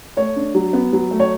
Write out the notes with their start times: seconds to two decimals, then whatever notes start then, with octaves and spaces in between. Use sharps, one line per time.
0.17 A3 C#5
0.36 D4
0.55 F#3
0.73 B3
0.93 F#3
1.11 A3
1.20 C#5